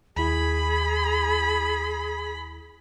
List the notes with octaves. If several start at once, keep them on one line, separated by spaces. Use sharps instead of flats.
D#2 E4 G#4 B5